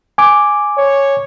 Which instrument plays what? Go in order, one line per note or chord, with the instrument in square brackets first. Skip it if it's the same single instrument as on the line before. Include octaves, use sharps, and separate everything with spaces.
[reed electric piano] G#5 D6
[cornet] C#5